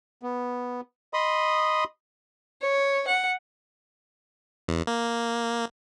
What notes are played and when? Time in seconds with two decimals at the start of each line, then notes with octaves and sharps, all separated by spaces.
0.23 B3
1.14 D#5 B5 C6 D#6
2.62 C#5
3.08 F#5
4.68 E2
4.87 A#3